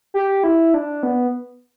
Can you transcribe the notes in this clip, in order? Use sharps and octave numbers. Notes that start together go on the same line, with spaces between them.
G4
E4
D4
B3